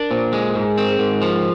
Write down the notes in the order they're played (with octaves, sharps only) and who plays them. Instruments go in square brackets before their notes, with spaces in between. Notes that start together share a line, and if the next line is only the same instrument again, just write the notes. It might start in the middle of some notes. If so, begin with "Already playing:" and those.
Already playing: [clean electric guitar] D4 [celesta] A#4
[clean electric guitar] A#2 [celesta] C5
[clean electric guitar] G#3
[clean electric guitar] G#2 [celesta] G#4
[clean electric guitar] C4 [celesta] A#4
[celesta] G#4
[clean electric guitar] G#2 [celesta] A#4
[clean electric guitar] F3 [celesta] A#4